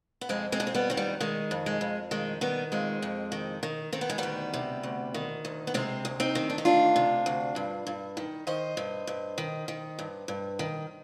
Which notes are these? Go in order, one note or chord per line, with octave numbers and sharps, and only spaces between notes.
B3
F2 G#3 C4
G#3 C4
F2 D4
C4
G3 B3
D#3 C4
G3 B3
D#3 G#3
F2
G#3
F2
D#3 G#3
D#3 G3 B3
F2 G#3 C4
F2
D#3
D#3
D#3 C4
B3
G#3
D2 G3 B3
C3
D2
D#3
D2
B3
C3 G#3 C4
D2
C4 D#4
D#3
D4
D#4
D2 D4 F4
C3
D2
G2
G2
D#3
D#3 C5 D#5
G2
G2
D#3
D#3
G2
G2
D#3